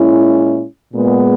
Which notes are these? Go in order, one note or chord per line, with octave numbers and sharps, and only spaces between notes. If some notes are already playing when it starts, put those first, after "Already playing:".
Already playing: A#2 G#3 C#4 E4
A#2 G#3 B3